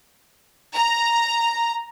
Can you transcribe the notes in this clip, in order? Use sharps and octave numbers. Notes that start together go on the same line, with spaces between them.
A#5